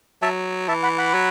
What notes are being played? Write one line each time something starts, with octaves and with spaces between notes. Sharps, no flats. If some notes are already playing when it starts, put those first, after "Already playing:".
F#3 E5 A5
E3 E5 A5
F#5 B5
F#5 B5
F#3